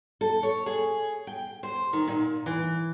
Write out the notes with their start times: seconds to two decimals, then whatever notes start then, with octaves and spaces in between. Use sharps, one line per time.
0.21 A4
0.43 C#5
0.66 G#4
1.27 G5
1.63 C5
1.93 D#3
2.08 A#2
2.46 E3